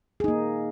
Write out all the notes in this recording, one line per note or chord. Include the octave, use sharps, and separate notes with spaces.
A#3 D#4 G#4